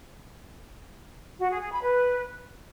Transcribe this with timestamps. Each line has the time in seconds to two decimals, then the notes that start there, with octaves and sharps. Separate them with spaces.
1.40 F#4
1.51 G#4
1.61 G#4
1.72 B5
1.82 B4